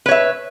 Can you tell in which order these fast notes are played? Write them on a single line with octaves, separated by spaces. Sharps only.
B4 C#5 E5